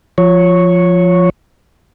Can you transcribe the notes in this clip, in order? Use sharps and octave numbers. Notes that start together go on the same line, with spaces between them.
F3 C#5